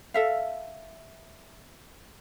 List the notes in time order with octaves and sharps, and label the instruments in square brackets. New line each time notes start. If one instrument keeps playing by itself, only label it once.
[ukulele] A4 E5 F5